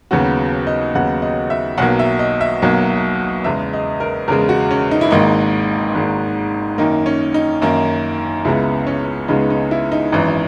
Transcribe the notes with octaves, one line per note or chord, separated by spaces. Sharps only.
D#2 C#3 F#3 B3 F#4
D#5
D#2 C#3 F#3 B3 F#5
D#5
E5
B1 B2 F#3 A#3 F#5
E5
D#5
E5
B1 B2 F#3 A#3
E2 C#3 G#3 E5
D#5
A#4
E2 C#3 G#3 A#4
F#4
C#4
D#4
E4
G#1 G#2 D#3 A#3 D#4
G#1 G#2 D#3 A#3
F#2 D#3 A#3 D#4
C#4
D#4
F#2 D#3 A#3 D#4
C#2 C#3 G#3 B3 E4
C#4
C#2 C#3 G#3 B3 D#4
D#4
E4
D#4
G#1 F#2 E3